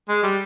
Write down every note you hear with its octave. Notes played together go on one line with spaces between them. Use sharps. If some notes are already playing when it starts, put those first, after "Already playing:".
G#3
G3